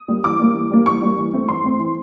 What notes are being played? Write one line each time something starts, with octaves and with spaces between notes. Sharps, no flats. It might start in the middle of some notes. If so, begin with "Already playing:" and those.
Already playing: D#6
G3 A#3
E3 D6
G3 A#3
E3
G3 A#3
E3 C#6
G3 A#3
E3
A3 C4
E3 C6
A3 C4
E3